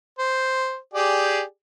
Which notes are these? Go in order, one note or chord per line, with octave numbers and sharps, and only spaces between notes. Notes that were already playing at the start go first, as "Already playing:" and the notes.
C5
G4 G#4 D5